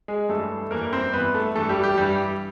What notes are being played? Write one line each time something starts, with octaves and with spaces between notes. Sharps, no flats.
G#3 G#4
G2 E3 A3 A4
G2 E3 A#3 A#4
C4 C5
G2 E3 B3 B4
A3 A4
G2 E3 A3 A4
G3 G4
G3 G4
G2 E3 G3 G4